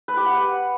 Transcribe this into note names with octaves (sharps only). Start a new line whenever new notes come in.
B4
G4
F#5